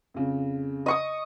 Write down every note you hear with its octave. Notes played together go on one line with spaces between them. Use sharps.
F2 C#3
D#5 C#6 D#6